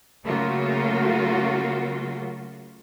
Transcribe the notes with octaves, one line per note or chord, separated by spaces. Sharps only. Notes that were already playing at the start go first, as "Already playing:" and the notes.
C#3 F#3 A3 A#3 F4 F#4